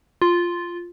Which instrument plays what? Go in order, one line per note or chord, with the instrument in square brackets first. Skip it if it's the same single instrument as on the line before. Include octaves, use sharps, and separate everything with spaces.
[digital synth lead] F4